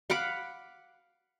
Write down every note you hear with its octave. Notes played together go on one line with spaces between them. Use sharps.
F5 F#5 B5 D6